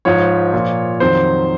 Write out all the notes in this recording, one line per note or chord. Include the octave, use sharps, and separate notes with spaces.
G#2 F3 C#5
A#2 F3
F2 D#3 F#3 C5